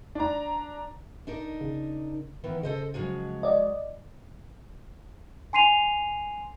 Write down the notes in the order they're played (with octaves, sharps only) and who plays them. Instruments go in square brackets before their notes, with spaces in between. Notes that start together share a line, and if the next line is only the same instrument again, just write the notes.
[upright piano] D4 A#5
[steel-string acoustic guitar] D4 D#4 A#4
[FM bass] C#3
[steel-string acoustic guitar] D#3 E3 B3
[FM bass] C#3 [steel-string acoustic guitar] A4 C5 D#5
[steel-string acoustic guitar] F3 F#3 G#3
[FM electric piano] D5 D#5
[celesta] G#5 C6 C7 D#7 F7